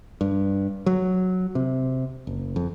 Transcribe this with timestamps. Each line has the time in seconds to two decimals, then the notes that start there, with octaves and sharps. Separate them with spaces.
0.21 G2
0.86 F#3
1.55 C3
2.27 F#1
2.56 F2